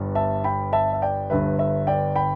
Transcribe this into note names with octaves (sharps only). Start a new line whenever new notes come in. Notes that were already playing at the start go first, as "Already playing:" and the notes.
Already playing: G1 G2 G3 B3
E5 A5
G5 B5
E5 A5
E5
D5 G5
G1 G2 D3 B4 E5
B4 E5
D5 G5
G5 B5